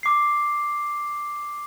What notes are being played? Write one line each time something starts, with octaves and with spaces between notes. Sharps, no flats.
D6 C7